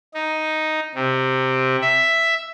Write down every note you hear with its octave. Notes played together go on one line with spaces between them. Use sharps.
D#4
C3
E5